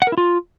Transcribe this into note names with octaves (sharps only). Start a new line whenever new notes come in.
F#5
A#4
E4
F4